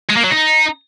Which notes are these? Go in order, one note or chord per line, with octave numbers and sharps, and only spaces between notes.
G#3
A#3
F#3
D#4